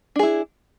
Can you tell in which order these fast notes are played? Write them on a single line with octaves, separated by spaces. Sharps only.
D4 G#4 E4